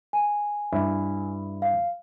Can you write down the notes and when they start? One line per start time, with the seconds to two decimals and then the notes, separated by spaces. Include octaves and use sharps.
0.13 G#5
0.73 G2 E4 E5
1.62 F5